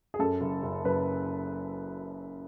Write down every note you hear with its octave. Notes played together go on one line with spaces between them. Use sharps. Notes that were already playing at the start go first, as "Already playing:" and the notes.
G#4
F#2 A4
F#1
F#1
F#1 B4